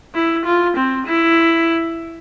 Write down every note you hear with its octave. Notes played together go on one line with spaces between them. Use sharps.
E4
F4
C4
E4